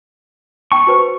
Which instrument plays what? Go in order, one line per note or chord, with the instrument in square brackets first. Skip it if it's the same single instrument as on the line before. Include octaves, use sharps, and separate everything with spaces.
[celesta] G5 A5 [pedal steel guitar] C#6
[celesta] F#4 B4 C5